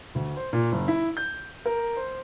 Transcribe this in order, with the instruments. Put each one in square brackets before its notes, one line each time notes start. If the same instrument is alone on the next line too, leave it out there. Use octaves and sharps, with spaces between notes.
[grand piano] D2
C5
A#2
F#1
E4
G6
A#4
C5